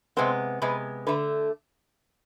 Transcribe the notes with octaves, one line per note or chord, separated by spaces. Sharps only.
C3 G#3 B3 C4
C3 G#3 B3 B4
D3 A3 B4